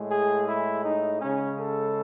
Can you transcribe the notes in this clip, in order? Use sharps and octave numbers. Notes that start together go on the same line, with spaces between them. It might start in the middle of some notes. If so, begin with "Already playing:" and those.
Already playing: A2 G#3
G#4
E4
D#4
C#3 G#3 C#4
A4